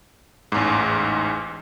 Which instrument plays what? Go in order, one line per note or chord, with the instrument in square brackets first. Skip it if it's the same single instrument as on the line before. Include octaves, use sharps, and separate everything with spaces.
[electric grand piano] A1 E2 G#2